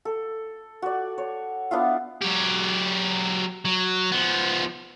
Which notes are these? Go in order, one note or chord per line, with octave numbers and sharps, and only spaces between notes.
A4
F#4 D5
C#5
B3 D4 E4 F4
F#3 G4
F#3
F3 B3